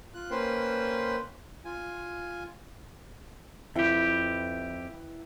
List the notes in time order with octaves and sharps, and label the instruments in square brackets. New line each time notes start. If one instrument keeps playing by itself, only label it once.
[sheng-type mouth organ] F4 F#6
A#3 C#4 B4 C5 G5 C6
F4 G#5
[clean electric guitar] F2 G4 [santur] E4 B4 G5